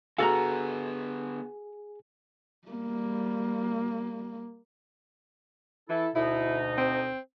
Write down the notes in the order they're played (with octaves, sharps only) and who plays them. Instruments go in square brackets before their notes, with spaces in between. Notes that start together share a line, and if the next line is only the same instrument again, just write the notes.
[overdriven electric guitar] D3 B3 [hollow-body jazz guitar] F#4 F5 [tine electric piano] G#4 G#5 [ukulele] A4 A#5
[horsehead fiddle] G3 A#3
[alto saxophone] E3 [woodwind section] E4 A4
[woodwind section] D2 B2 D#4 [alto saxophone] E4
[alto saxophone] C4